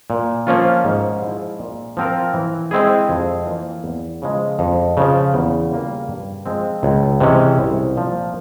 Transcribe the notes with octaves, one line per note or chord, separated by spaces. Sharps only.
A#2
F3 A#3 C#4 F4
G#2
F3 G#3 E4
A#2
F3 C4 F4 A#4
E3
G#3 C4 E4 G#4
F2
E3 A#3 F4
E2
C#3 F3 G#3
F2
C#3 F3
E2
C#3 G3 A#3 F4
G2
F3 G#3 C4
C#2
C3 E3 G#3 C#4
C2
A#2 F3 A#3